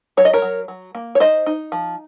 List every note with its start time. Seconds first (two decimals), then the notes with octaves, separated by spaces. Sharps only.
0.17 F#3 C#5
0.25 D#5
0.33 A#4 C#5
0.42 F#3
0.68 F#3
0.95 A#3
1.15 C#5
1.20 D#4 C5 D#5
1.46 D#4
1.72 F3